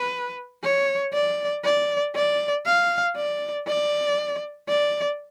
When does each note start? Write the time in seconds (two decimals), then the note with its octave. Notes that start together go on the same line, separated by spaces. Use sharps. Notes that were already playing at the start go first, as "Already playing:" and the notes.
Already playing: B4
0.63 C#5
1.13 D5
1.64 D5
2.15 D5
2.66 F5
3.16 D5
3.68 D5
4.69 D5